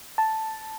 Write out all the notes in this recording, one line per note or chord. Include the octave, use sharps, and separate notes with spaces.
A5